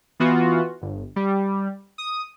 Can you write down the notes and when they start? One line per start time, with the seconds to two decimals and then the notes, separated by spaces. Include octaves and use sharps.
0.20 E3 B3 F4 F#4
0.82 G1
1.16 G3
1.98 D#6